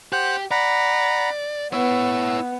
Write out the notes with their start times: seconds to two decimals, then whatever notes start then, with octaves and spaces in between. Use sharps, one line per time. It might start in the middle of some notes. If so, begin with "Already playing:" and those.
0.13 G4 C5 F#5 F#6
0.51 D5 F#5 A#5 B5
1.73 B3 E4 C#5 E6